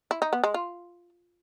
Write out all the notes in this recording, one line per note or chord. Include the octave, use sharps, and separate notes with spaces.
E4
D#4
B3
G#3
F4